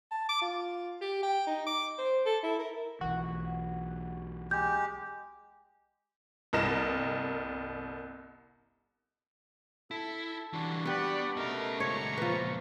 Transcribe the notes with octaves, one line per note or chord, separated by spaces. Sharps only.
A5
D6
F4
G4
G5
D#4
D6
C5
A4
E4
A#4
B1 E3 F#4
G#3 G4 G6
G1 C2 A#4 D#5 A#6 E7
E4 A4
D3 E3 G3 D4 F#4
B3 G4 B4 D5 F#5
B2 A3 C#4 A#4 D#5
C#2 A#2 C#5 A#5 C#6
F3 B4